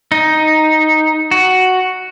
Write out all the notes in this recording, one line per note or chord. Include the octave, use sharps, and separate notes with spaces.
D#4
F#4